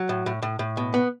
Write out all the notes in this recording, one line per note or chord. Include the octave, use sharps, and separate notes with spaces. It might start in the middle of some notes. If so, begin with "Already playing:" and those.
Already playing: F#3
A2
A2
A2
A2
B2
B3